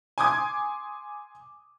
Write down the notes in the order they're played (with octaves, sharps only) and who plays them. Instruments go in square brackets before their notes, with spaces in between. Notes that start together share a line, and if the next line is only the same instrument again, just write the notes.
[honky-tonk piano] G#5 C6 D6 D#6 G#6